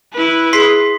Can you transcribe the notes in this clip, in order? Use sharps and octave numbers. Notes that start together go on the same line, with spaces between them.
E4 B4
G#4 C6 B6 C7